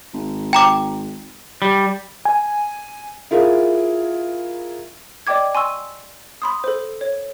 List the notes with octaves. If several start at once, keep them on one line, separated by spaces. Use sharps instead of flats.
G#1
G5 A#5 D6
G3
G#5
E4 F4 G#4 A#4 F5
D5 D#5 G5 D6 G#6
G#5 C6 C#6 E6
B5 C6 D#6
A4 C5
C#5